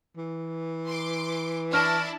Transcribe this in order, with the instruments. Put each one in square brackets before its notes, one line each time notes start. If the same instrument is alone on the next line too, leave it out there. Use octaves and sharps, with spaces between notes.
[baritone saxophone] E3
[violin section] C6 D6
[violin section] D4 E4 A5 [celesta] C#6 F6 A#6